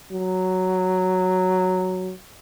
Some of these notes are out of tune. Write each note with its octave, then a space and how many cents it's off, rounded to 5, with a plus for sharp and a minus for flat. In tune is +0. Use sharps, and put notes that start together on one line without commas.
F#3 +0